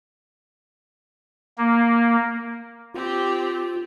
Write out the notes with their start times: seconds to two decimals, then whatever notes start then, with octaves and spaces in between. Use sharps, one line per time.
1.58 A#3
2.94 C4 F4 G4